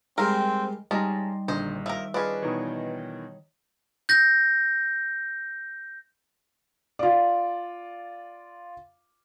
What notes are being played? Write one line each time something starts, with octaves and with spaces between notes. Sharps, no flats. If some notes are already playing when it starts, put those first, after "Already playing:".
G3 G#3 C4 A#4
G3 G#3 C#4 D#4 D#5 A5 A#5 C6
A#1 D3 D#3 C5 D#5
F3 A#4 E5
C#4 D4 F4 G#4 B4 D#5
B2 D#3 E3 C#5 A#5 D#6
G6 A#6
F4 D5